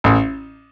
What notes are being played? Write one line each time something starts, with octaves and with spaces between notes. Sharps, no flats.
A1